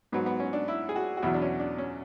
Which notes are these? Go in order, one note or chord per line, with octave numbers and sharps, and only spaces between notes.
G#2 F#3 B3
B3
C#4
D4
E4
G#4
F#4
F#4
E2 B2 F#3 E4
D4
C#4
D4
C#4